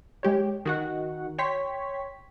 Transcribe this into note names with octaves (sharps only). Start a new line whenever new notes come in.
G#3 G4 C#5
D#3 F#4 F#5
C#5 G5 C6 B6